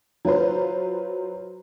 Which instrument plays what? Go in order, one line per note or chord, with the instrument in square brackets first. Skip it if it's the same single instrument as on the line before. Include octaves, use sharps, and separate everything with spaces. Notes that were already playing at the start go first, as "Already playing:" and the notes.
[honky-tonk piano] F#3 F4 B4 C5